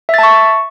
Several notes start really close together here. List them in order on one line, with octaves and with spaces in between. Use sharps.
E5 A6 A5 C#6